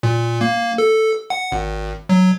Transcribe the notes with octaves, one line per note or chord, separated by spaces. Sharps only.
A#2
A#3
A4
F#5
G#1
F#3